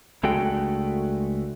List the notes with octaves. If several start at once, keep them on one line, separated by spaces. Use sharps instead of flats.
C#2 G#3 A3 D4 F#4 G5